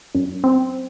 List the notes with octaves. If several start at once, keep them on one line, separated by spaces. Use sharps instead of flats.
F#2
C4